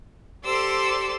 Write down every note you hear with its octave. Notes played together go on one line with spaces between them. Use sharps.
G4 A4 C5 D5 C6 E6